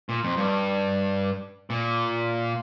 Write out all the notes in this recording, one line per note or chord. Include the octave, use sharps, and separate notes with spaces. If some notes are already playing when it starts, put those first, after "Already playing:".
A#2
F2
G2
A#2